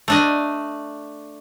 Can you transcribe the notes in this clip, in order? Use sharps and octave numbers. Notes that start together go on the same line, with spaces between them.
A3 D4 D#5